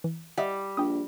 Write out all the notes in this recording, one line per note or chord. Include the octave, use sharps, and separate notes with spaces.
E3
G3 D#5 E5 F#5
A#1 G5 D#6